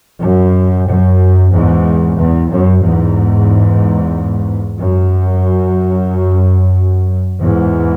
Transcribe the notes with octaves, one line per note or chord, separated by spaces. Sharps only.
F#2
F#2
E2 G#2
E2
F#2
E2 G#2
F#2
E2 G#2